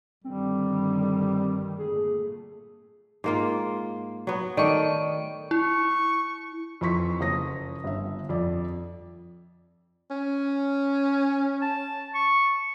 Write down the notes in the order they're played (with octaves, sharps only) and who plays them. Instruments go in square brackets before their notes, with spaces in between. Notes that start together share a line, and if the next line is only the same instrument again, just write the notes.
[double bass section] G2 D3 D#3 [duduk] G3 [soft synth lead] C4
[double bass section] A#2 A3 [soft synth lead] G#4
[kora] G#2 A#3 F4
F#3 B3
[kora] D#3 A3 [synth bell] D5 D#5 C#6
[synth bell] E4 [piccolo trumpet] C#6
[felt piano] F2 E3 C6 C#6 B6
F#1 C#5 D#6 A#6
G1 E5
F2 D5
[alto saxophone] C#4
[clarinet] A5
C#6